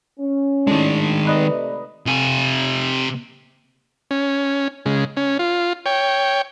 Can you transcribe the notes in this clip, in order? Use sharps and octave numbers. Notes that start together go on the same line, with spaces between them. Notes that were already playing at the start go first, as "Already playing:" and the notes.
C#4
A2 D#3 G#3 D4
C3 A3 D#4 B4 D5 D#5
C3 G#5
C#4
C#3 G#3
C#4
F4
C#5 G5